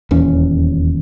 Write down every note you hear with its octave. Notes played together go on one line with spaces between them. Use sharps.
D#1 E2 C#4